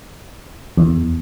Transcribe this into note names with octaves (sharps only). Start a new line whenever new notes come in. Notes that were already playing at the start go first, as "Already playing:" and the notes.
E2